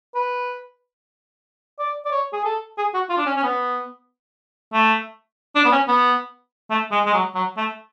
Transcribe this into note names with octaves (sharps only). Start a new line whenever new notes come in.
B4
D5
D5
C#5
G#4
A4
G#4
F#4
F4
D4
C#4
C#4
B3
A3
D4
B3
C#4
B3
A3
G#3
G#3
F#3
F#3
A3